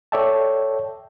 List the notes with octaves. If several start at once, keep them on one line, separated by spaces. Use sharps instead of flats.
A4 C#5 D5 E5 G5 A5